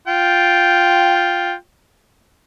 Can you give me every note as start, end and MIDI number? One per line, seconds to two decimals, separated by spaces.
0.08 1.53 65
0.08 1.53 79